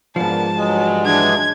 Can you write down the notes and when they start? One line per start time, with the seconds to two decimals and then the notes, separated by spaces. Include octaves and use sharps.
0.16 G#2 F3 A#3 B3 D4 A5
0.57 G2 F#3 G#3
1.05 E3 G#3 D4 G#6